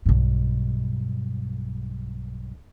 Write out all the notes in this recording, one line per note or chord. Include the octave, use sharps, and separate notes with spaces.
B1 G2